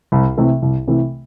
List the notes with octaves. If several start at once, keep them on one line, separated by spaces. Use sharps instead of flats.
C2
C3 E3 A3
C2
C3 E3 A3